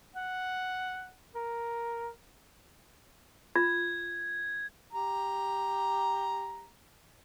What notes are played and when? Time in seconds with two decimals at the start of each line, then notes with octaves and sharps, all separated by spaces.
0.15 F#5
1.35 A#4
3.56 F4 G#6
4.93 G4 A#5